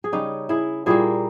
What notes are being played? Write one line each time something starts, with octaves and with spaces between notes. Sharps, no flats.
G#4
C#3 G3 C#4 D#4 G4
E4 G#4
A#2 G3 A#3 E4 G#4